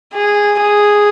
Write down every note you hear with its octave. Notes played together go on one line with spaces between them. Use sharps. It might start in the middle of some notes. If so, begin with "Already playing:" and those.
G#4
G#4